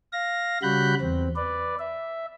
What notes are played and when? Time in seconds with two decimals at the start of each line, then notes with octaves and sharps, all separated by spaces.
0.13 F5 A#6
0.63 C#3 G3 F#4 B5 F#6 G6
1.01 E2 C4
1.36 B4 D5
1.79 E5